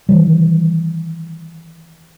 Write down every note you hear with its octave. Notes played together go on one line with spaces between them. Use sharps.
D#3 E3 G3